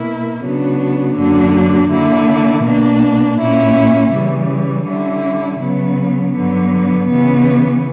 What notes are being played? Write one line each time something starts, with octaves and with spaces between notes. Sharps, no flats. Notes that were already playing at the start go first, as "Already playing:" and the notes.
Already playing: B2 A#3 E4
C#3 F#3 B3 D4
F#2 D3 F#3 A#3 D4
D3 A#3 E4
B2 A#3 D4
A#2 A#3 C#4 E4
C#3 E3 G3
D3 G3 C#4 E4
C#3 F#3 B3
G2 D3 F#3 B3
C#3 E3 B3